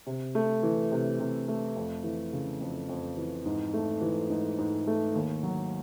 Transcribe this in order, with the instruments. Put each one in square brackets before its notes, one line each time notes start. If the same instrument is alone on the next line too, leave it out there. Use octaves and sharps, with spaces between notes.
[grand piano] C3
A3
E3
C3
C3
A3
F2
E3
C#3
F2
F2
E3
G#2
A3
E3
G#2
G#2
A3
D#2
F#3